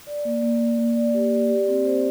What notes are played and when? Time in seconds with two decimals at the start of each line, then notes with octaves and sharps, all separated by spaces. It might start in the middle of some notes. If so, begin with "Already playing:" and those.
0.07 D5
0.25 A#3
0.42 A#3
0.60 A#3
0.79 A#3
0.96 D5
1.14 G4
1.31 D5
1.50 G4
1.68 C4
1.85 C5